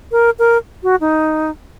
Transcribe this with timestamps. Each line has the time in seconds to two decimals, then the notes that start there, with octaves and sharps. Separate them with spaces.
0.12 A#4
0.39 A#4
0.83 F#4
1.01 D#4